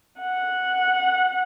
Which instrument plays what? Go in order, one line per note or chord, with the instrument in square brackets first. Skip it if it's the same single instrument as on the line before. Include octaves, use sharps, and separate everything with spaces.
[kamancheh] F#5